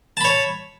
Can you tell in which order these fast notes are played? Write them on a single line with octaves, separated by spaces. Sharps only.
A5 B5 C#5